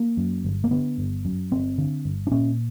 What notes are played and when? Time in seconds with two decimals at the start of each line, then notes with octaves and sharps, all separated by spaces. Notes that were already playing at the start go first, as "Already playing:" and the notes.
Already playing: A#3
0.17 F#2
0.45 G1
0.64 A#3
0.71 D3 B3
0.98 G1
1.25 F#2
1.51 G1 C4
1.78 D3
2.05 G1
2.27 D4
2.31 A#2 C#4